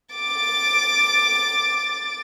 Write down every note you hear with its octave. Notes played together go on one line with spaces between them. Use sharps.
D6 A6